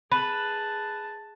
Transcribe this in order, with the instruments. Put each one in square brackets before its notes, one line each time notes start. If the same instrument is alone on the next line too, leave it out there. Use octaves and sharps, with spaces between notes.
[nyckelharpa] G#4 A5 [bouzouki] B4